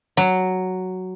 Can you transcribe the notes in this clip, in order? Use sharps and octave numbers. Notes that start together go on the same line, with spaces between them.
F#3